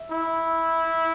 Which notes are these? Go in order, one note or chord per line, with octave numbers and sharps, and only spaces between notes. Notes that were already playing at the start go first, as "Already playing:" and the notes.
Already playing: E5
E4